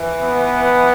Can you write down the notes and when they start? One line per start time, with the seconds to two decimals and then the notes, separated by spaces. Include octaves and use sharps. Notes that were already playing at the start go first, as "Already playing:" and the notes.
Already playing: E3
0.21 B3